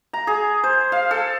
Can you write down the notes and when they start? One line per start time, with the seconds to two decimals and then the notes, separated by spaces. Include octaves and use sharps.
0.13 A#5
0.27 G#4
0.64 C5
0.92 F5
1.11 A4